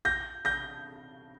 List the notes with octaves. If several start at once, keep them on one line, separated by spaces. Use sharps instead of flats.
G6 A#6
G6 A#6